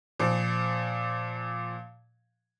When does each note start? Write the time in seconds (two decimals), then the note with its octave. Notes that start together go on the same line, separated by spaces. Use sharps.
0.19 A#2 F3